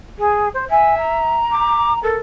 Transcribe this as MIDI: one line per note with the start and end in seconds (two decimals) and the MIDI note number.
0.18 0.48 68
0.54 0.64 72
0.70 1.35 76
0.70 0.94 80
0.97 1.98 82
1.51 1.93 86
2.03 2.17 69
2.03 2.19 70